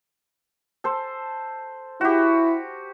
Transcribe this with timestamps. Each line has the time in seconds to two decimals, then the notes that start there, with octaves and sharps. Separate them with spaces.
0.84 A4 C5
2.01 E4 F#4 G4